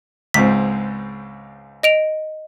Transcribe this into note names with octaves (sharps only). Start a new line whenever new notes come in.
C#2 G#2 C4 B6
D#5 D7 F7